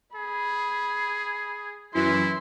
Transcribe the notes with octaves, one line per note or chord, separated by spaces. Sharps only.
G#4 B5
F#2 E3 E4 C6